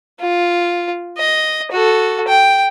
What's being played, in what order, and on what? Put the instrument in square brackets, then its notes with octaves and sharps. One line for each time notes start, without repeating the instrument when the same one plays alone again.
[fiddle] F4
D#5
F#4 A4
G5